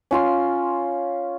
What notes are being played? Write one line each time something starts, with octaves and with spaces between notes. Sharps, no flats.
C#4 F4 C6